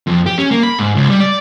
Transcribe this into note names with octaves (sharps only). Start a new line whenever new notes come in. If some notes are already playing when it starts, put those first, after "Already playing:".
F2
G4
C#4
A#3
B5
G#2
C#2
G3
D5